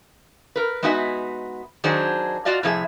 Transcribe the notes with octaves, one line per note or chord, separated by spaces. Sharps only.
A#4 B4
G#3 B3 D#4 F#4 E5 G#5
D#3 F#3 D4 G#4 C5 F#5
F4 F#4 D5 D#5 F5
A2 C3 F3 E4 G#4 E5